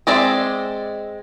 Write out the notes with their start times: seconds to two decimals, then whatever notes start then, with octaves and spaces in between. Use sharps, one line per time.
0.07 G#3 C4 D5 E5